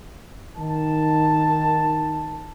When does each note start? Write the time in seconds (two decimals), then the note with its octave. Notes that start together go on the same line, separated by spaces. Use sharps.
0.57 D#3 A5